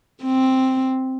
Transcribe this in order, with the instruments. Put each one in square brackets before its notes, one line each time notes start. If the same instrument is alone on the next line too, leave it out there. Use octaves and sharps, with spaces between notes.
[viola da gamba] C4